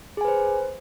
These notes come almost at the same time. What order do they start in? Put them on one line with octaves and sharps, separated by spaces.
G#4 G#5 B4 C5